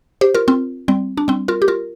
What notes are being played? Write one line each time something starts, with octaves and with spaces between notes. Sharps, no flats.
G4 C5
F4 A#4
C4 F4
G3 C4
D4
G3 C4
F4 A#4
G4
F4 A#4